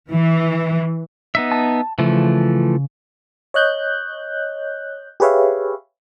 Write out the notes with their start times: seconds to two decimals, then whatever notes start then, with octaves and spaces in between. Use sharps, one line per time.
0.11 E3
1.35 B3 D#4 E5
1.52 A5
1.99 C#3 E3 F3 A3
3.54 C#5 D#5 F#6 G6
5.20 G4 G#4 B4 C#5 E5 F5